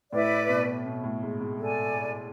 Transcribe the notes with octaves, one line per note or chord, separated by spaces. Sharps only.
A2 E4 B4 D5
B2
B2
A2
G#2
G#2
A4 D5 G#5